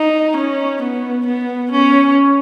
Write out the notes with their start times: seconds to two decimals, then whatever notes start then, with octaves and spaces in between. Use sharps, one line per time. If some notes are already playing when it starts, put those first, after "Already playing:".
Already playing: D#4
0.36 C#4
0.81 B3
1.26 B3
1.71 C#4